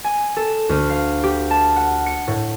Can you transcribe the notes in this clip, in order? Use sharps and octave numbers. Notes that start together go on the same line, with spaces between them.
G#5
A4
D2
F5
G4
A5
F#5
C#7
A2